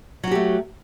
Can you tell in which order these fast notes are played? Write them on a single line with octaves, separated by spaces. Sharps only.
F#3 F#4 G4 A3